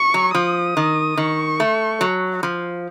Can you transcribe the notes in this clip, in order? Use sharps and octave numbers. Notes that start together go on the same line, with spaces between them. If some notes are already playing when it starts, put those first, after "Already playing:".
Already playing: C#6
F#3
F3 D#6
D#3
D#3 C#6
A3
F#3
F3